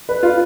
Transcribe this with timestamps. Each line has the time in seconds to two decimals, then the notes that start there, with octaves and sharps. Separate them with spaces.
0.09 B4
0.23 F4